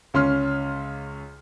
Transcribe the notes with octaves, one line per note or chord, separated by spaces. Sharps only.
C#2 C#4 C6 F6